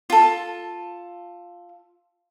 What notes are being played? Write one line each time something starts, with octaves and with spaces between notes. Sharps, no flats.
F4 A4